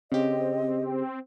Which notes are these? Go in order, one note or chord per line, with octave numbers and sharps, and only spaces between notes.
C#3 C4 G4 D#5